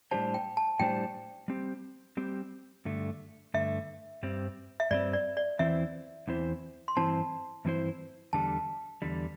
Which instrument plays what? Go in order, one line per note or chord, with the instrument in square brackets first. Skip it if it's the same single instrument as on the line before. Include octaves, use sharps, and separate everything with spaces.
[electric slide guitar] A2 G3 D4 G4 C5 [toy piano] A5
[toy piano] G5
A5
[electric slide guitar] A2 G3 D4 G4 C5 [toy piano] G5
[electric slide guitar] G3 C4 G4
G3 C4 G4
G2 D3 A3
[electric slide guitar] G2 D3 A3 [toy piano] E5
[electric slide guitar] G2 G3 C4
[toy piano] E5
[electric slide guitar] G2 G3 C4 [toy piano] D5
[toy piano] D5
D5
[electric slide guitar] E2 E3 C4 E4 C5 [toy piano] E5
[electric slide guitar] E2 E3 C4 E4 C5
[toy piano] C6
[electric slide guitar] G2 E3 C4 E4 C5 [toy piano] A5
[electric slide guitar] G2 E3 C4 E4 C5
[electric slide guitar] E2 D3 G3 [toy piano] A5
[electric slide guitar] E2 D3 G3